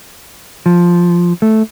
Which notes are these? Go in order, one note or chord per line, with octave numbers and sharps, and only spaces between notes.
F3
A3